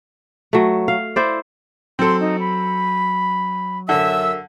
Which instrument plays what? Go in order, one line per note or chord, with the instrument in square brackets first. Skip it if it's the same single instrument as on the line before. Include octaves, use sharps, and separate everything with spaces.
[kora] F#3 A3
F5
E4 C5 D5
[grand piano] F#3 [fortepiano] C4 A4 [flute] C6
[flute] D#4
B5
[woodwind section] F#2 E5 E6 [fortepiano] D3